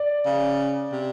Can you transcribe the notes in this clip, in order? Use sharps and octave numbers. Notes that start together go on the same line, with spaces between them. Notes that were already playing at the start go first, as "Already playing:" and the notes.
Already playing: D5
C#3
C3